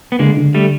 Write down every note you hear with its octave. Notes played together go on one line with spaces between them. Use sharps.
B3
D3 G#3 A#3
D3
G3 A3